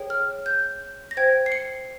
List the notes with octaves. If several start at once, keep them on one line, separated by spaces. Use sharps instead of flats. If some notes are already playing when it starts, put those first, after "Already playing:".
Already playing: G#4 C#5 G5
F6
G6
A#6
C5 G5 G#6
C7
C#7